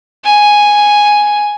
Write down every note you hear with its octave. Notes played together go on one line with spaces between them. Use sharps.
G#5